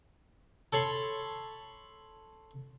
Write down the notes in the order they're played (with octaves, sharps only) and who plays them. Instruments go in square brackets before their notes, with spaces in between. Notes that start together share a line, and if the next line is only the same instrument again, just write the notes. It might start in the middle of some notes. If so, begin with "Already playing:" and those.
[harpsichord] A4 C#5 B5 C6